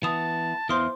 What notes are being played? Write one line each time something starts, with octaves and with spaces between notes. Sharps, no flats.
E3 B3 A5 D#6 E7
E2 E3 C5 F5 C6 D#6